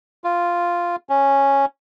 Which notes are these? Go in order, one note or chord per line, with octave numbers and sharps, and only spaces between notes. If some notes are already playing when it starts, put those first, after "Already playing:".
F4
C#4